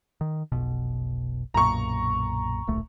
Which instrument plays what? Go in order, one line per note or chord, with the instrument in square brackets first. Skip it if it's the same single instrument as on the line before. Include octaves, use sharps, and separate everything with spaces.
[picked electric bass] D#3
F1 B1 B2
[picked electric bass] B1 F#2 A#2 [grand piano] A#5 C#6
[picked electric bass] D1 A#1 A3